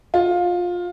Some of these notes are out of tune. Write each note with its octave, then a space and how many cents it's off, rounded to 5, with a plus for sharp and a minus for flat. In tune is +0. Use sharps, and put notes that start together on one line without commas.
F4 +20